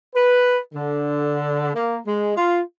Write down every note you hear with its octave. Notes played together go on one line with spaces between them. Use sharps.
B4
D3
A#3
G#3
F4